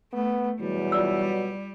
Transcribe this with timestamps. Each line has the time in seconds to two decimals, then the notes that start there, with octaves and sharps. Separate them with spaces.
0.13 A3 B3
0.60 E2 B2 F#3 G3 B3
0.92 F4 D5 E6